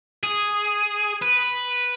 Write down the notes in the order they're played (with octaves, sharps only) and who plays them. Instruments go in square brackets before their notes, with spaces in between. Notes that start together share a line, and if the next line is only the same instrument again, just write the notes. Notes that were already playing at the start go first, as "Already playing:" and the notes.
[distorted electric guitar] G#4
B4